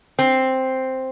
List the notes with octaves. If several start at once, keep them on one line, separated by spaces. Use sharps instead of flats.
C4